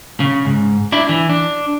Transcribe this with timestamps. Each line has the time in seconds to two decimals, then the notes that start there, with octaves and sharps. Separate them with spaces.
0.20 C#3
0.45 G#2
0.92 D4 E4
1.09 E3
1.29 D4